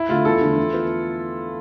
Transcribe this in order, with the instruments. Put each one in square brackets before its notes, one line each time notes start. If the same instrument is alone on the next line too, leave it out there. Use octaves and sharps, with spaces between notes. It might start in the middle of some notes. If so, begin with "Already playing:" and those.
Already playing: [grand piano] E4
[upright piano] D3 A3 [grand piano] F4
[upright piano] E2 [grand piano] A4
[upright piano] D3 F3 A3 D4
E3
B3 F4